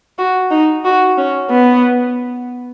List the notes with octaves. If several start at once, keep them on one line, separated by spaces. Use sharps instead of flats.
F#4
D#4
F#4
C#4
B3